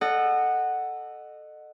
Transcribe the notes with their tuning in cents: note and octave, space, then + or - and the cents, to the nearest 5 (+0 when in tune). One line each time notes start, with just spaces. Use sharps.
A4 +0 D#5 -30 F#5 +0